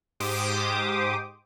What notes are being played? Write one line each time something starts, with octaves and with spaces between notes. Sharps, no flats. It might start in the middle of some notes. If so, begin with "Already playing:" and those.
G#2 G4 C5 D6 D#6